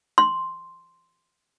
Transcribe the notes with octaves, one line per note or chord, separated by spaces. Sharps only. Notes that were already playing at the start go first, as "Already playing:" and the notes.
C6